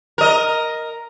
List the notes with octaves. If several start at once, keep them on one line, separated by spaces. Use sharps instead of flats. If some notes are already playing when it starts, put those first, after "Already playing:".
A#4 D#5